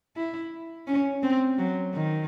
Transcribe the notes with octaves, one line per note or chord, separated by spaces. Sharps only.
E4
C#4
C4
F#3
D#3